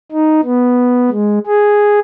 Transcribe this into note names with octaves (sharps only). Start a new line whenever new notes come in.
D#4
B3
G#3
G#4